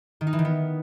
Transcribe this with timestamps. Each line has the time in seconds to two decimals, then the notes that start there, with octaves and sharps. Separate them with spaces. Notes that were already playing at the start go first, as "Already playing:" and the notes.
0.21 D#3
0.27 D#4
0.33 E3
0.39 D#3
0.45 B3